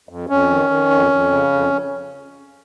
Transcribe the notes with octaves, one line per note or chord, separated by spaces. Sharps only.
F2
F2 C#4
D#3
D#3
F2
F2
C#3
F2